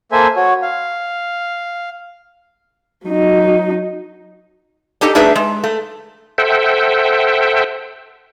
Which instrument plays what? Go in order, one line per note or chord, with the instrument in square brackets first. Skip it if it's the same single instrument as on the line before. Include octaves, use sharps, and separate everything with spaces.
[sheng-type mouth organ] A#3 A4 C5 E5 G#5
F#4 C#5
F5
[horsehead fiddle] F#3 D#4
[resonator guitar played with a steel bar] D4 D#4 G4 A4 D#5
A3 D4 D#4 G#4 B4 E5
G#3
A3
[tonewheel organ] A4 C5 E5 F#5 G5